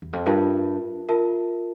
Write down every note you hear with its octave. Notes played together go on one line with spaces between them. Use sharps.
E2
F2
G2 F4 A#4 E5 A5
F4 A#4 E5 A5